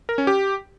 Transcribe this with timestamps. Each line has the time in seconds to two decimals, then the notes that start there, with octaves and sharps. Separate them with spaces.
0.09 A#4
0.18 C#4
0.27 G4